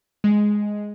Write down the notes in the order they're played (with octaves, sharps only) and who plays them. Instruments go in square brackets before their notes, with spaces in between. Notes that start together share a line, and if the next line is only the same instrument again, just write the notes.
[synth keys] G#3